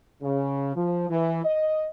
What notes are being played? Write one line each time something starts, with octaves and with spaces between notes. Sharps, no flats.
C#3
F3
E3
D#5